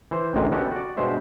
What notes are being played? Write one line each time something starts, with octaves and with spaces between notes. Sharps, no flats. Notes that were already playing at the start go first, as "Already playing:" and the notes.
E3 C5
A1 D2 G#2 C3 D#3 G#3
B3 C#4 F#4 G4 A4
F#4 D5
G2 B2 G#3 C5 E5